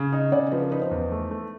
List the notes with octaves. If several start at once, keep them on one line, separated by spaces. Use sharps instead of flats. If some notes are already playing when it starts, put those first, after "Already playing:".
Already playing: C#3
D#4 D#5
C#3 D5
F3 B4
A#4
D#4 B4
C5
E2
A3
A3